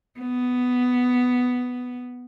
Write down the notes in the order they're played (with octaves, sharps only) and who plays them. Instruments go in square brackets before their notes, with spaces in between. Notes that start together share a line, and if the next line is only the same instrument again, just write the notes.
[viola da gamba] B3